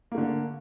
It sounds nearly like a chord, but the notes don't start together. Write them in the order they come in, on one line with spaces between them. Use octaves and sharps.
A#3 A3 D3